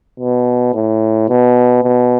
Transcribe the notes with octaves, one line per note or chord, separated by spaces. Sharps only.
B2
A2
B2
B2